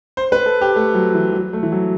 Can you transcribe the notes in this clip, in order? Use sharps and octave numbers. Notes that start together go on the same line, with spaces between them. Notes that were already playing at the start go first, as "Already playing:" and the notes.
C5
B4
A4
G4
A3
F#3
E3
F#3
A3
E3
F#3